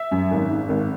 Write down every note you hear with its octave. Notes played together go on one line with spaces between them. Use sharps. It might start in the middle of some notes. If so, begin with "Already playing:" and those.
Already playing: E5
F#2
G#1
G#2
G#1